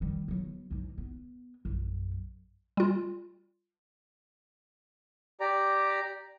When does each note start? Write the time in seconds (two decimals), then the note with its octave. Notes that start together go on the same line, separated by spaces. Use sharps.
0.01 D#3 G3
0.28 F#3 B3
0.71 A1 D#4
0.98 B3
1.65 A#1 F#2
2.77 G3 F4
5.40 G4 D5 A#5